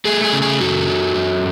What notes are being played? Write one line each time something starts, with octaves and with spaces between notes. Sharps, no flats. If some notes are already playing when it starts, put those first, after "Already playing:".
A3 G#4
G#4
C#3
G#4
F#2 F#4 A4
F#3
F#2